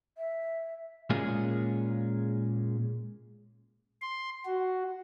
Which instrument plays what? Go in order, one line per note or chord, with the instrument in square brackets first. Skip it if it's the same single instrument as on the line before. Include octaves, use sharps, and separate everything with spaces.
[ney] E5
[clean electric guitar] A#2 G#3 A#3 C#4 F4 G#4
[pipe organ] C6
F#4